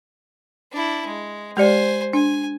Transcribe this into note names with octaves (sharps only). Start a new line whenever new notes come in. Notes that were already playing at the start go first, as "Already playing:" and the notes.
D4 E4
G#3
G#3 G4 C5 D5 G#5
D4 G#5